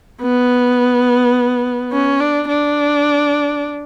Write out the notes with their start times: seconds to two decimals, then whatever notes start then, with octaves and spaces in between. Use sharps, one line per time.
0.22 B3
1.93 C#4
2.20 D4
2.49 D4